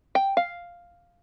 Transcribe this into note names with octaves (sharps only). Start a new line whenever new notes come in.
G5
F5